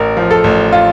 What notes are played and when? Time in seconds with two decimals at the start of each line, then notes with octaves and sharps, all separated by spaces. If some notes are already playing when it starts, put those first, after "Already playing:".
Already playing: A1 A#4
0.17 F3
0.31 A4
0.44 A1
0.73 F4